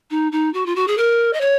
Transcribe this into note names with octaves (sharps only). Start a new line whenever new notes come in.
D#4
D#4
F#4
F4
F#4
G#4
A#4
D#5
C#5